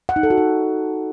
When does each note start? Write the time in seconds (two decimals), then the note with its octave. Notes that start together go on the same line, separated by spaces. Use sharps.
0.09 F#5
0.16 D#4
0.23 A4
0.30 F#4
0.38 D#4